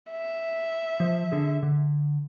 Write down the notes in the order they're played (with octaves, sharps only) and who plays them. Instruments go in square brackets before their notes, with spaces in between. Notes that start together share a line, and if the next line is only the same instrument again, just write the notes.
[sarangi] E5
[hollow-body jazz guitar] F3 C5
D3 G#4
D3